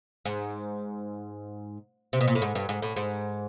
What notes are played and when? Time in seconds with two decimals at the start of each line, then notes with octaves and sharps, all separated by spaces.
0.25 G#2
2.13 C3
2.21 B2
2.27 A#2
2.35 A2
2.42 G#2
2.55 G2
2.69 G#2
2.82 A2
2.96 G#2